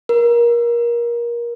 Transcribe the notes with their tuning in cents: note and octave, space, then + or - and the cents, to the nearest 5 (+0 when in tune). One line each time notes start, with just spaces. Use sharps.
A#4 +25